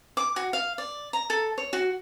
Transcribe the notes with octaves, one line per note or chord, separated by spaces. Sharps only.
D6
F#4
F5
D5
A#5
A4
C#5
F#4